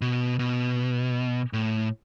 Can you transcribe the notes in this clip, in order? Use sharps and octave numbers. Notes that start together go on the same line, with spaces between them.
B2
B2
A2